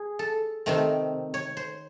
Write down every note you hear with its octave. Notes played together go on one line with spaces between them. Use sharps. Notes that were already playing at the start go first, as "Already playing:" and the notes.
Already playing: G#4
A4
C3 D#3 A3 C4
C#5
C5